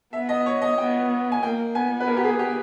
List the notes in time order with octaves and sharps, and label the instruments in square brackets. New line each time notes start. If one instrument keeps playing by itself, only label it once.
[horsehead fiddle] B3 [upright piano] E5
[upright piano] D#5
C#5
D#5
[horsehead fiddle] B3 [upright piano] G5
[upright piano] G#5
[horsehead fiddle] A#3 [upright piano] G5
[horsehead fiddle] B3 [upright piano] G#5
[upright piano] B4
A#4
G4
G#4
G4